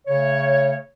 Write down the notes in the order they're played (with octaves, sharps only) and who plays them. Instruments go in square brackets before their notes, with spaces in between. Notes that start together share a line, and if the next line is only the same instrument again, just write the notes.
[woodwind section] C#3 A3 C#5